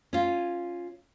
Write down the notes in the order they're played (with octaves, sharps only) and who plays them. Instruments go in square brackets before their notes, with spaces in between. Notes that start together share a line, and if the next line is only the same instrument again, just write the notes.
[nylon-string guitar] C#4 F4